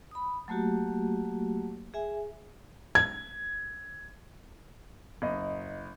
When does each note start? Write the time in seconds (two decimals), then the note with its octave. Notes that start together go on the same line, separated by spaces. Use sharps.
0.11 B5 D#6
0.48 F#3 A3 A#3 F#4 G4
1.94 G#4 E5 G#5
2.95 G#6
5.22 F#1 D#5